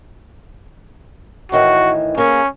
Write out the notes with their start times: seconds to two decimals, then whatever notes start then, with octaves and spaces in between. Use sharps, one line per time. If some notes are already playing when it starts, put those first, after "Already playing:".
1.52 A2 D#3 E3 F#4
2.18 A#3 C#4 G#4